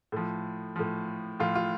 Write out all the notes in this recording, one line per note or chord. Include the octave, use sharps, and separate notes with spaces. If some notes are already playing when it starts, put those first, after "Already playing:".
A2 F3
A2 F3
A2 F3 F4
F4